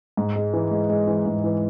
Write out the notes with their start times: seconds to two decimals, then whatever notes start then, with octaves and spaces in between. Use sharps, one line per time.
0.17 G#2
0.36 G#3
0.53 E3
0.71 G#3
0.89 G#3
1.07 E3
1.26 G#2
1.44 E3